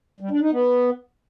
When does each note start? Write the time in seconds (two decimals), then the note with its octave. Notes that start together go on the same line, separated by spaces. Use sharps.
0.20 G3
0.31 D4
0.41 D#4
0.52 B3